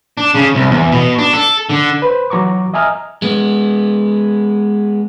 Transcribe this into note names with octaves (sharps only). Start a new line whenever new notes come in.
D4
C#3
C2
E2
B2
D4
A4
D3
B4 C5
E3 F#3 A#5 C#6 D6
D#5 E5 G#5 A#5 D#6 F6
G#3 B3